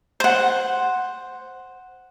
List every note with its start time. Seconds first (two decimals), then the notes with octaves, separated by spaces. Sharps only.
0.20 C5 F#5